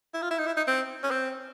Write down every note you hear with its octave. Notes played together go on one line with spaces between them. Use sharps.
E4
F4
E4
D#4
E4
D#4
C4
C#4
C4